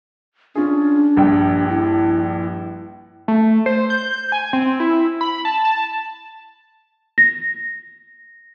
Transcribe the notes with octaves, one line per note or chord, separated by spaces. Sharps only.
C#4 D4 F4 G#4
A#1 G2 G5
E4
A3
C5
G6
G#5
C4
E4
B5
A5
A5
A#6